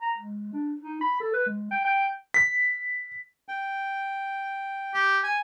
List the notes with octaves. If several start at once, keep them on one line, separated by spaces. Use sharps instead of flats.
A#5
G#3
D4
D#4
B5
A4
B4
G#3
G5
G5
B6
G5
G4
G#5